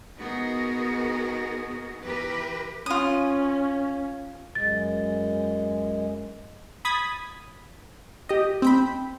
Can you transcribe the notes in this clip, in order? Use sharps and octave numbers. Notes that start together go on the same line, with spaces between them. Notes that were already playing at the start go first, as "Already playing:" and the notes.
B3 D#4 F#4 G#4 A#4
E3 G4 A#4 B4
C#4 F4 D#6
F#2 G#3 A6
B5 D#6 G#6 A6 B6
G4 D#5
C4 G5 B5